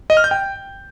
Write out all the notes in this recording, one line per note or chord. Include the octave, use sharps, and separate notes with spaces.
D#5
F6
G6
G5